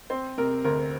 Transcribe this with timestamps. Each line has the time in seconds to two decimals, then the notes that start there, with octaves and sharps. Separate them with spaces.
0.10 C4 C5
0.38 C3 A#4
0.64 D2 A#4